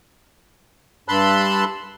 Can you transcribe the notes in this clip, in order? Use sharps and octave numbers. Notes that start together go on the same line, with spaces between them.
G2 A5 B5 C6 E6 F#6